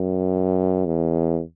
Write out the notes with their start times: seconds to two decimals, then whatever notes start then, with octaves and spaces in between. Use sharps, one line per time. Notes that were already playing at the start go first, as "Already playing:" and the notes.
Already playing: F#2
0.86 E2